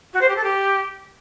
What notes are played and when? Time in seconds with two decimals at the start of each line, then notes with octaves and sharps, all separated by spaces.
0.14 F#4
0.21 C5
0.29 G4
0.36 A4
0.44 G4